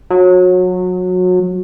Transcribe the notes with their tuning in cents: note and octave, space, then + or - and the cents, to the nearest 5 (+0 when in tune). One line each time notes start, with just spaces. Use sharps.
F#3 -25